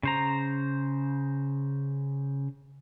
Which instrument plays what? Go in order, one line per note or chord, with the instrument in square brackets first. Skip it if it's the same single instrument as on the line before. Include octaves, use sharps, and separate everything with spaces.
[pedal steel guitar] C#3 C5 A#5